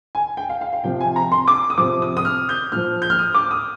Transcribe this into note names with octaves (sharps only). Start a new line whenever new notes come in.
G#5
G5
F5
F5
F5
C3 F3 G5
G#5
A#5
C6
D6
D#6
C3 F3 D6
D#6
D#6
F6
G6
A#2 F3 F6
G6
F6
D#6
D6
D#6